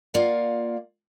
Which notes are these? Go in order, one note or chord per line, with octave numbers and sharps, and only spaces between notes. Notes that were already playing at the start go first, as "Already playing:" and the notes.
A#3 F4 D5 F5 F#5